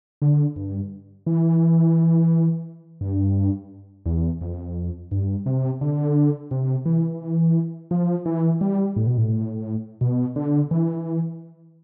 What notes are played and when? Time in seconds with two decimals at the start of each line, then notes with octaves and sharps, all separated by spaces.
0.22 D3
0.56 G2
1.27 E3
3.01 G2
4.06 E2
4.41 F2
5.11 G2
5.46 C3
5.81 D3
6.51 C3
6.86 E3
7.91 F3
8.26 E3
8.61 G3
8.96 A2
9.07 B2
9.18 A2
10.01 B2
10.36 D3
10.71 E3